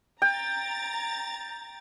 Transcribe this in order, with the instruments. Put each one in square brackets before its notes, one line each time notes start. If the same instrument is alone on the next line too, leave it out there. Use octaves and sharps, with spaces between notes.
[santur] G5 [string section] A#5 A6